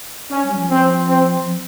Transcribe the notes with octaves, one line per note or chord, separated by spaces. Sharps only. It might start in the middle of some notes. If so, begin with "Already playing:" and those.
C#4
G3
F3
C4
C4
F3